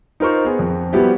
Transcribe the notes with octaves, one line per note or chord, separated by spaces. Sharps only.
D#4 F4 A#4 C5 C#6
B3 G#4
F2
F3 G3 B3 E4 F#4 G4